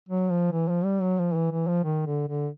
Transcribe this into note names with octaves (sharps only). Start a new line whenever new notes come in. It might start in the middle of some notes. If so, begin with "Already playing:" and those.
F#3
F3
E3
F3
G3
F#3
F3
E3
E3
F3
D#3
D3
D3